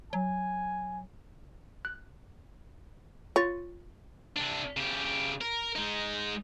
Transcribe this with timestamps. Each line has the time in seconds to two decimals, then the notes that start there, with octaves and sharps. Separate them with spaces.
0.13 F#3 G#5
1.85 F#6
3.36 F4 C#5 A6
4.36 C3 D4
4.77 C#3 G4
5.41 A#4
5.76 G#3 D#4